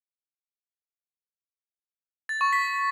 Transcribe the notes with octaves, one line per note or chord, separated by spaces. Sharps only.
A6
C#6
B6